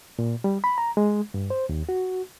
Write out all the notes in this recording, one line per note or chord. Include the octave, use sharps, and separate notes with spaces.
A#2
G3
B5
A#5
G#3
G2
C5
D#2
F#4